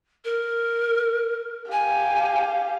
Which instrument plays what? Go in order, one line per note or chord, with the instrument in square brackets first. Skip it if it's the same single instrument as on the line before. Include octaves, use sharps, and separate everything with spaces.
[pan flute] A#4
[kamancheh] G4 F5 [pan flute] G#5